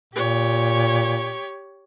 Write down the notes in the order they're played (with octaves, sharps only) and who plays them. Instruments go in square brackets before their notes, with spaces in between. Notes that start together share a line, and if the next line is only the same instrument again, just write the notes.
[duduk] A#2 [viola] G4 C#5